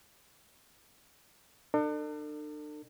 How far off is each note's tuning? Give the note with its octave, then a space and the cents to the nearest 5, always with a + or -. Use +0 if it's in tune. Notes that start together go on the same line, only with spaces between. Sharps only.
D4 +40 A4 +40